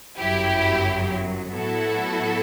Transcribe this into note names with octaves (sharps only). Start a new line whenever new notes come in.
G1 F#2 F#3 E4 G4
A2 F#3 B3 E4 F#4 A4